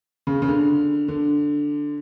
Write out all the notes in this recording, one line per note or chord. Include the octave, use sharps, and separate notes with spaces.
C#3
C#3
D3
D3